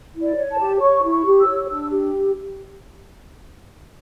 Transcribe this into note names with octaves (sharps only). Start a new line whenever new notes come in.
E4
D5
C#5
A5
G4
C#5 C#6
E4
C#6
G4
E6
C#5
D4 E6
G4